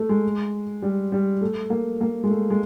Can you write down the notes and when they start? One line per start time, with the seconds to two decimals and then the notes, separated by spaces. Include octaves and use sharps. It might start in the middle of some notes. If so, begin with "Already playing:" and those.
Already playing: A3
0.09 G#3
0.82 G3
1.12 G3
1.41 A3
1.70 A#3
2.01 A#3
2.24 G#3
2.29 A3
2.50 G#3